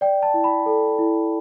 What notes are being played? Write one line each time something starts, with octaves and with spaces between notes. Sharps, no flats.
D5 G5
A5
E4
B5
A4
E4